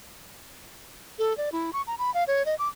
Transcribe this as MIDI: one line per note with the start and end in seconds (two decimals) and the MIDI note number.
1.19 1.36 69
1.37 1.49 74
1.52 1.70 64
1.73 1.82 85
1.87 1.95 82
1.98 2.13 83
2.14 2.24 77
2.27 2.45 73
2.46 2.55 75
2.59 2.68 86